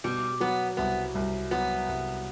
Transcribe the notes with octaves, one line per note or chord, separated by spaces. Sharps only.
B2 G3
F#3 B3
C2 B3
C2
F#3 B3
C2